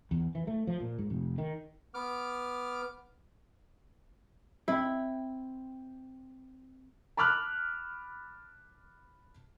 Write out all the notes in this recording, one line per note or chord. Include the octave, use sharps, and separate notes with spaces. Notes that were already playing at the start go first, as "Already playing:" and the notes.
E2
E3
A3
F3
A#2
G#2
F1
D#3
B3 D6 F6
C4 E4 G5
A5 B5 D6 F6 F#6